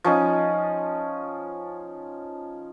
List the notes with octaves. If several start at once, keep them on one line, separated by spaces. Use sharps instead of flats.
F3 C#4 D#4